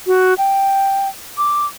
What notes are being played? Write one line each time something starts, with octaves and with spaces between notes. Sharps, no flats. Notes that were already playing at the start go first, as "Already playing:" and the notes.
F#4
G5
D6